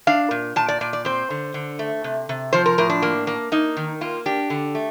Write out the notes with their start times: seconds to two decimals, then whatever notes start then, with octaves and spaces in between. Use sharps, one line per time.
0.07 D4 F5
0.31 A#2
0.56 A#2 A5
0.68 D5
0.81 A#2 D5
0.93 D5
1.05 C4 C5
1.30 D3
1.54 D3
1.79 A3
2.04 C3
2.29 C3
2.53 F3 C5
2.66 A#4
2.78 A2 A#4
2.90 D4
3.02 A#3
3.27 A#3
3.52 A#3 D#4
3.77 D#3
4.01 A#3 F4
4.26 D4 G4
4.50 D3
4.75 A3